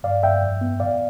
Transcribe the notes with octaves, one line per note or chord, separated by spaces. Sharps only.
G2 D5 F5
G2 E5 G5
F2
B3
A2 D5 F5